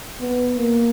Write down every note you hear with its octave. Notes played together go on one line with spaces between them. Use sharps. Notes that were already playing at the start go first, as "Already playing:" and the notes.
B3
A#3